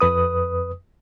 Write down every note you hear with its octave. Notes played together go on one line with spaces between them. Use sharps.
F2 B4 D#6